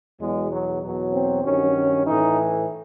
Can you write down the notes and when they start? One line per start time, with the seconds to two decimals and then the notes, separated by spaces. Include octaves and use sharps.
0.20 E2 B2 F#3 G#3
0.51 F#3
0.82 E2 B2 F#3
1.12 C4
1.43 G2 D#3 F#3 C#4
2.05 A2 E3 D#4